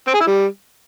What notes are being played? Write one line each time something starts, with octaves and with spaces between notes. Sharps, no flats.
C4
G#4
E4
G3